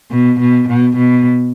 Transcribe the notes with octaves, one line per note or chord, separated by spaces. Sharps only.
B2
B2
B2
B2